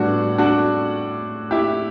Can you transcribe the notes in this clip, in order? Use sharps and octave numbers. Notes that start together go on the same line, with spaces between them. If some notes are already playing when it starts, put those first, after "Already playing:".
Already playing: A2 G3 B3 D4 F#4
D4 F#4
E4 G4